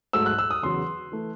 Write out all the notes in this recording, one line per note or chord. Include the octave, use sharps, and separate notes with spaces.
G#2 F#3 A3 E6
F#6
E6
D#6
E2 C#3 F#3 C6
E3 A3